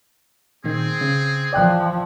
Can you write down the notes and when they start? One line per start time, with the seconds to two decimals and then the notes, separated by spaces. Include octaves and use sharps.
0.64 A#2 D#3 C4 G#4
1.01 C#3
1.53 E3 F3 D5 G5 F#6